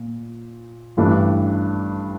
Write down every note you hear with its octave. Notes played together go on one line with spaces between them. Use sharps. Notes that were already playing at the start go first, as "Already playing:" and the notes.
Already playing: A#2
A1 G2 E3 A3 D4